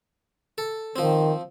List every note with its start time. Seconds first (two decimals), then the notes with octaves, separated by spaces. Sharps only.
0.58 A4
0.96 D#3 F3 C4